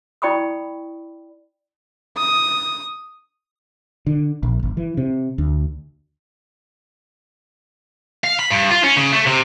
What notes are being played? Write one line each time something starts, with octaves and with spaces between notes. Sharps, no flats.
E4 D5 G5 B5 C#6 D#6
D#6
D3
A#1
G1
E3
C3
D2
F5
B5
G2
F4
C#4
C#3
A3
C3